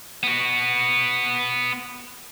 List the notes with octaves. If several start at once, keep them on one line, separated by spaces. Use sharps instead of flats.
B3 F#4